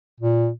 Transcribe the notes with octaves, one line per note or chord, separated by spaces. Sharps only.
A#2